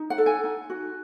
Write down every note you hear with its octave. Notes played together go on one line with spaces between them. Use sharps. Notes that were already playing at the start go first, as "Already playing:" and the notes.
Already playing: D#4
F#5
A4
G#5
D#4
F#4